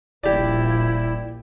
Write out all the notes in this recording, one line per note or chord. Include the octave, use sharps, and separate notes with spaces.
D#1 A#1 A#2 E4 G4 D5